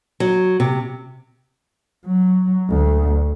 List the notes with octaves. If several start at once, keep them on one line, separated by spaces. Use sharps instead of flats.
F#3
C3
F#3
D2